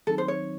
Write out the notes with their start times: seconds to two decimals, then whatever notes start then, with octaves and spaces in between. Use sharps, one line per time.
0.07 D#3 F#3 C4 D#4 A4
0.18 C5
0.28 C#5